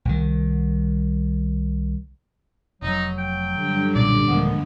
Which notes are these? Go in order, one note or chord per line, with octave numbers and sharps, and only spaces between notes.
C2 D#3
F1 F#3 D#4
G5
G2 D3
B1 A#2 C#3 D5
D#1 F3 G#3 A#3 B3